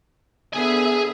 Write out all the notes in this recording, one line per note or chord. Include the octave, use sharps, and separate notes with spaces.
D3 B3 G#4 E5 G#5